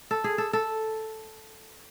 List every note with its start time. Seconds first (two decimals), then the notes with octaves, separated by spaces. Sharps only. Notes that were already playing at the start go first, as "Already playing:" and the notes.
0.11 A4
0.24 G#4
0.38 A4
0.53 A4